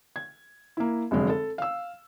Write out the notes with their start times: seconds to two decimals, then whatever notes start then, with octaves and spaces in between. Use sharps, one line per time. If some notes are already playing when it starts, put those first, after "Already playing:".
0.16 G#6
0.77 A#3 E4
1.11 F1 F#2 D3 G#3
1.29 A4
1.58 F5 E6